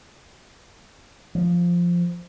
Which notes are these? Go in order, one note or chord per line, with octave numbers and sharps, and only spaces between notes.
F3